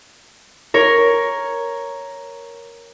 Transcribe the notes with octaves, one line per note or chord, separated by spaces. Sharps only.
A#4 C#5